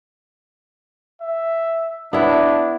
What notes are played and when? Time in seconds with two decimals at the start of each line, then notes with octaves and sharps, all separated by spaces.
1.21 E5
2.13 B3 D4 E4